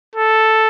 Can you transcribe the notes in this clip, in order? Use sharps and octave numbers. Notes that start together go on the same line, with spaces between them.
A4